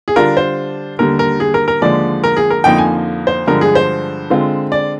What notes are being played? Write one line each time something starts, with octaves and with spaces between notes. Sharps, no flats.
G#4
D3 G3 D4 F4 A#4
C5
D#2 D3 G3 A#4
A#4
G#4
A#4
A#4
D#2 D3 F3 G#3 D5
A#4
G#4
A#4
F2 D3 F3 A#3 D#4 G5
G#5
C5
G2 D3 F3 G#3 A#4
G#4
C5
D3 G#3 C4 F4
D5